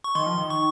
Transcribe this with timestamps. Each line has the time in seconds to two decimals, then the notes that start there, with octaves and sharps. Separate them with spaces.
0.04 C#6
0.15 D#3 C6
0.26 F3
0.38 D#3
0.50 C#6